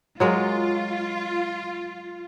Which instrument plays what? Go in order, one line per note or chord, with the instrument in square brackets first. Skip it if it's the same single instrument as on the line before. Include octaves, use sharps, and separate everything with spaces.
[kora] F#3 G#3 A#4 [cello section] F4